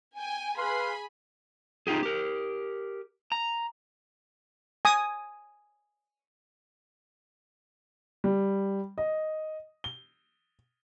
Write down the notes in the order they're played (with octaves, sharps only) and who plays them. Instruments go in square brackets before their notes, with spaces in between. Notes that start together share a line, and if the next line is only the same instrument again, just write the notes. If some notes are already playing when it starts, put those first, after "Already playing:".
[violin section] G5 G#5
[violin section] G#4 G#5 B5 [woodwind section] B4 F5 C6
[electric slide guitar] D#4 F4 G4 G#4
G4 A#4
A#5
[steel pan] G#5 D#6
[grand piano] G3
D#5
G7